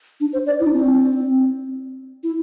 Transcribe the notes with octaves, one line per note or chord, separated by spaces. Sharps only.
D4
C5
D5
E4
D4
C4
E4